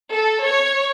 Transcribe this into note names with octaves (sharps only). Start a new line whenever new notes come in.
A4
C#5